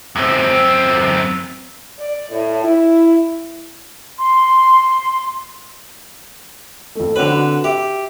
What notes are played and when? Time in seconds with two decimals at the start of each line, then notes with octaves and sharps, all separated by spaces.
0.16 F#2 C4
1.99 D5
2.30 A2
2.64 E4
4.19 C6
6.95 F2 A3
7.16 D3 C4 C#4 F#4 B4
7.30 F#4
7.64 G4 E5